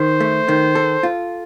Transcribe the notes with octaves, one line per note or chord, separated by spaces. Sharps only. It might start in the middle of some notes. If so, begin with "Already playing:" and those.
Already playing: D#3 C5
A3
D#3
A4
F4